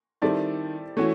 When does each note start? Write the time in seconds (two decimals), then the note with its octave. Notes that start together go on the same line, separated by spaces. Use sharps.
0.22 D#3 G3 C4 E4 A4 D5
0.97 E3 A3 C#4 F#4